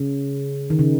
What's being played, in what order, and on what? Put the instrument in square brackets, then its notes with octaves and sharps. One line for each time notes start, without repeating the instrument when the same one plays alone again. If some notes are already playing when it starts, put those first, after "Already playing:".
Already playing: [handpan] C#3
D#3
C#3